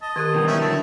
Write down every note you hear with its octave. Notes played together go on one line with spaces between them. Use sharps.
D#5 A5
D#3 G4 A#4
B2 E3 G3 G5
C#4 D#4 E5
D3 F#3 E4 A5